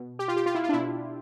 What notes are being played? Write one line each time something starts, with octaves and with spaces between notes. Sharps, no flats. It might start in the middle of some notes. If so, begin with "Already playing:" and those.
Already playing: B2
G4
F4
G4
F4
E4
F4
D4
B2 E4